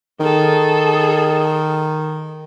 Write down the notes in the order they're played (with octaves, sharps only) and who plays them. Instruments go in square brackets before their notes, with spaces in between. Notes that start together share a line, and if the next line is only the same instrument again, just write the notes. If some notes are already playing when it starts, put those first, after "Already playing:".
[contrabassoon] D#3 [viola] G#4 A4